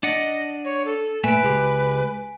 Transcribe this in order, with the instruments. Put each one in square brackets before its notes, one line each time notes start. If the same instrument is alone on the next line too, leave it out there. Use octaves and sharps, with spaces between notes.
[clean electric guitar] D4 D5 F#5 [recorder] D#5 [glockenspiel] D#7
[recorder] C#5
A4
[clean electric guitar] A#2 A3 E5 [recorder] B4 [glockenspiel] G#5 B6 D7
[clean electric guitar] C#2 G#3 G4